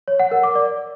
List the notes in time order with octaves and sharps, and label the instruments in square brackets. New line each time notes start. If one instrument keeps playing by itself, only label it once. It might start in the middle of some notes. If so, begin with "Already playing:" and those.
[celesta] C#5
F#5
A#4
D6
D5